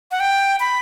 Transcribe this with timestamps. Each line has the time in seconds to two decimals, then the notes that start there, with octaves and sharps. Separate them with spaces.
0.11 F#5
0.20 G5
0.60 B5